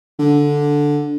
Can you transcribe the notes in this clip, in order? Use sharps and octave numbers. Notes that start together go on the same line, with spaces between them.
D3